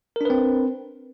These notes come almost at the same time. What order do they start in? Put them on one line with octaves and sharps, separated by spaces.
A#4 D4 B4 C4